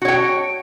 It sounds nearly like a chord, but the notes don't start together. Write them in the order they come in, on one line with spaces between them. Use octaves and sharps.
F#4 C#5 G5